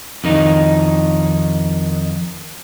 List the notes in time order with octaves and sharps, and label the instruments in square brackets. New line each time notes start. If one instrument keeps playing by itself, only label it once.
[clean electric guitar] F2 D#3 D#4